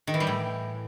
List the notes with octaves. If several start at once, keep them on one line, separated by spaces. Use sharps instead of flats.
D#3
E3
G3
A2